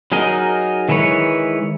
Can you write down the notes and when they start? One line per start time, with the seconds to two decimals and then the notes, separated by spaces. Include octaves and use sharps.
0.12 F#3 D#4 G#4 A#4 D#5
0.89 D#3 E3 G#3 B4 C#5